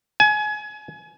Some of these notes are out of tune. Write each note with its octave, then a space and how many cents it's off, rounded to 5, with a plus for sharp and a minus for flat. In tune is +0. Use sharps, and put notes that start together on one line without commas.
G#5 +30